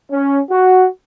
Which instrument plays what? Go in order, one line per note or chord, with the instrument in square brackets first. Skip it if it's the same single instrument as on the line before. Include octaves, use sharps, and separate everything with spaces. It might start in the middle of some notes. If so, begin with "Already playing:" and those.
[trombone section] C#4
F#4